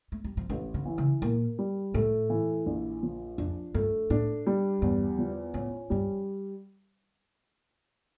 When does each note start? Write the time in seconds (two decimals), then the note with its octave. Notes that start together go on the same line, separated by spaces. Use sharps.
0.12 A3
0.24 G3
0.37 F3
0.50 A1 E3
0.74 D3
0.85 E3
0.98 C#3
1.22 A#2 A#3
1.59 G3
1.94 A2 A3
2.30 E3
2.66 A#1
3.03 F3
3.38 F2 D4
3.74 G2 A3
4.10 A2 D4
4.47 G3
4.82 E2 G2
5.18 F3
5.54 A2 C#4
5.90 G2 G3